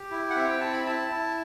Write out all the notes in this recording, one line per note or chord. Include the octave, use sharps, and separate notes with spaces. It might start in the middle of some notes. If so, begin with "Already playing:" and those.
Already playing: G4
E4
F#5
C4 E5
G5
E4 A5
B5
E4 A5
E4